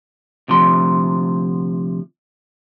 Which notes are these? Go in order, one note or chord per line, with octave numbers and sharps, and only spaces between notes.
D2 C3 F3 C6